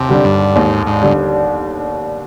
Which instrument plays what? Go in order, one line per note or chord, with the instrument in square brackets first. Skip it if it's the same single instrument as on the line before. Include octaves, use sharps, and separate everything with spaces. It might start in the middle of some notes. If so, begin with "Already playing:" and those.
Already playing: [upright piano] D#2 [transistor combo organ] C3
[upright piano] D3 G3 D4
[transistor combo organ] G2
[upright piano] D#2 [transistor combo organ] G#2
[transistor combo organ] G#2
[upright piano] D3 G3 D4